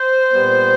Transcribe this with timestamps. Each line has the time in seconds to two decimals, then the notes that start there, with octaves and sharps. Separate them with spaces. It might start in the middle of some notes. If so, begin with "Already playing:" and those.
Already playing: C5
0.31 A#2 G3 B3